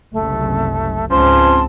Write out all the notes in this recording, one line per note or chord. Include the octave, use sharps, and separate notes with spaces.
F#1 C2 A3
C#2 G#2 F3 C4 C#4 A5 C6